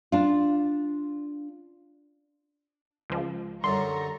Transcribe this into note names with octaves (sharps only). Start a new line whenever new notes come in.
D4 F4
C#2 F3
F#2 D3 G3 A#5 C6 C#6